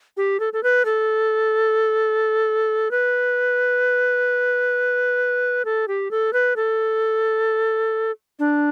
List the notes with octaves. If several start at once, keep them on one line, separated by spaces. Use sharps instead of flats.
G4
A4
A4
B4
A4
B4
A4
G4
A4
B4
A4
D4